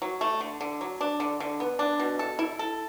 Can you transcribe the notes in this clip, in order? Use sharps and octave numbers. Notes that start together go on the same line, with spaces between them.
F#3
A3
D3
D3
F#3
D4
D3
D3
B3
D4
B2
A4
E4
A4